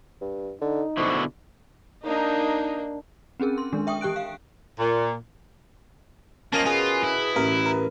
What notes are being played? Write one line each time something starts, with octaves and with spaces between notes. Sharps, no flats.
G2
D3 D#4
B2 D3 E4 C5 C#6
A#3 D4 D#4
C4 C#4 G#4 A#4
C6
D#3 G#3 D4
E5 G5 C#6 D#6
E3 G4 G5 F#6 D7
F5
A#2
F3 A#3 C#4 A#4 D#5 A5
B2 F4 G#4
E4
A1 A#4
A#4